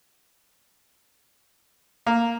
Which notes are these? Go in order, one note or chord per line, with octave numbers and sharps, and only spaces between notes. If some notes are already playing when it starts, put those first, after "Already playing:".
A#3